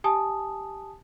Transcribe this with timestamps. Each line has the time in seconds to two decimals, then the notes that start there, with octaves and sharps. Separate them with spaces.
0.04 G4 G#5 A5 D#6